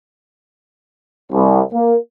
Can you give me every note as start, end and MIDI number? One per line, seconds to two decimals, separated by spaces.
1.32 1.60 36
1.73 1.96 58